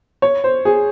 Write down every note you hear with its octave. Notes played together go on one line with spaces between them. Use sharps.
C#5
C5
G#4